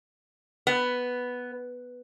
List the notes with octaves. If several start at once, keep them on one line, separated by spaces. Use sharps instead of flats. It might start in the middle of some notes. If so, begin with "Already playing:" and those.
B3